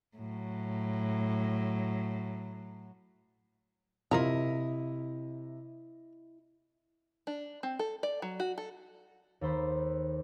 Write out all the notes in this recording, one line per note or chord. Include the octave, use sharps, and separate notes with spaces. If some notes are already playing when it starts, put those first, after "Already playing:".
A2 F#3
C3 E4 F4 A#4 D#5 A#5
D4
C4
A4
D5
F#3
F#4
A4
D#2 A4 C5 B5 G6